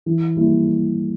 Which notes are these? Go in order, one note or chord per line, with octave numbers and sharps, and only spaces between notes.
E3
G3 A#3 E4